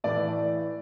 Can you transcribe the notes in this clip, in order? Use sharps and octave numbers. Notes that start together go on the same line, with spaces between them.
A2 E3 A3 D5